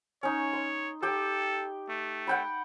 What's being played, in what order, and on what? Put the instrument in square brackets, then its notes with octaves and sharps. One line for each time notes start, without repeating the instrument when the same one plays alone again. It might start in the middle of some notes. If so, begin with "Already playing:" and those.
[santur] C#4 D#4 [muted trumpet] C#5
[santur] C6
[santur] G4 G5 [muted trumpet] A4
[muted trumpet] A3
[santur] F#5 G5 B5